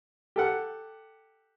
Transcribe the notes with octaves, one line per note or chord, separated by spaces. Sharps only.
G4 A4 F#5